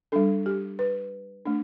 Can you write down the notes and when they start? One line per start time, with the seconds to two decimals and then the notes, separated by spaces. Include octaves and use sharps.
0.12 G3 D4 A4
0.46 G4
0.79 B4
1.46 A3 D4